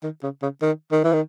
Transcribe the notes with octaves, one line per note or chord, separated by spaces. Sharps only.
D#3
C#3
C#3
D#3
D#3
E3
D#3